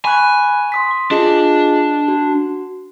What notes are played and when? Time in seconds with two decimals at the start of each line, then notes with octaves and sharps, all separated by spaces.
0.05 G#5 B5 C#6 F#6
0.72 C6 D#6 B6
1.11 D4 F4 G#4 D#5
2.08 F#4